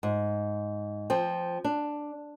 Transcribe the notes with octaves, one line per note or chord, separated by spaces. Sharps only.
G#2
F3 C4
D4